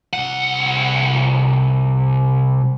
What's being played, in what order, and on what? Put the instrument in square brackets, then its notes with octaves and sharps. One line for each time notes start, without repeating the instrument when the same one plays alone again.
[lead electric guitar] C2 F#5